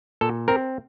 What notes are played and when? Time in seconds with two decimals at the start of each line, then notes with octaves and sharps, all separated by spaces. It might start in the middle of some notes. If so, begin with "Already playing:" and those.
0.21 A#2 A4
0.48 C4 A#4